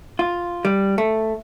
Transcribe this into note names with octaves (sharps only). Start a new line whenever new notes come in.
F4
G3
A3